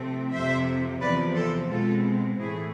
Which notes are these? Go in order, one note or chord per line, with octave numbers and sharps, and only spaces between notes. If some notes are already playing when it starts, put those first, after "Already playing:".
Already playing: C3 F3 A3 C4
F2 C3 F3 C5 E5
E2 C3 F3 B4 D5
A4 C5
B2 G#3 C4 F4 A4
A2 E3 A3 E4 G#4